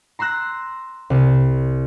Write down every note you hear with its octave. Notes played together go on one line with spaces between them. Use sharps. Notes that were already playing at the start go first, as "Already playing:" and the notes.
A#5 C6 E6 F#6 A#6
C2